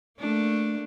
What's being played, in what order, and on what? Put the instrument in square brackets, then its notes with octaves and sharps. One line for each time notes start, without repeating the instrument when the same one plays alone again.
[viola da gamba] A3 A#3 D4